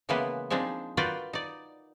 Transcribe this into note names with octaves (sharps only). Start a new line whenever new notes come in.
C#3 E3 G#3 A#3 B3 B4
F3 G#3 C4 D4 D#4
F4 F#4 A#4 B4 D5 G5
D#4 D5